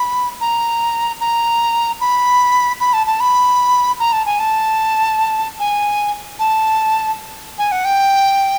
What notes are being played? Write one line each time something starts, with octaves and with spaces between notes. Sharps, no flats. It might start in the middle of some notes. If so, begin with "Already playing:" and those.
Already playing: B5
A#5
A#5
B5
B5
A5
A5
B5
A#5
A5
G#5
A5
G#5
A5
G#5
F#5
G5